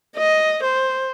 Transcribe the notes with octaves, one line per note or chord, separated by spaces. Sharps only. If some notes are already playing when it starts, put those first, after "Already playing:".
D#5
C5